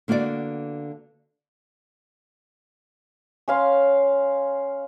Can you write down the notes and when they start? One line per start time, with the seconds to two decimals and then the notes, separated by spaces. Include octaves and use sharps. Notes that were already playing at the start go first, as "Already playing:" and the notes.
0.08 D3 A#3 B3 F#4 D5
3.48 C#4 F5 C6